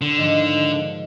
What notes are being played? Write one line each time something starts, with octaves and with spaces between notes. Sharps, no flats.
D3
G#2 D#3 F3